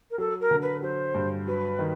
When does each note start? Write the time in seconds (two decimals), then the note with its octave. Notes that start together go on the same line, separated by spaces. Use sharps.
0.10 A#4
0.18 F#3 A4
0.41 A#4
0.51 D3
0.62 B4
0.82 F#3 C5
1.15 G2
1.47 F#3 B4
1.79 D#3